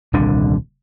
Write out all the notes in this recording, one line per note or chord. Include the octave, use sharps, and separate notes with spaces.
D#1 C2 D3 D4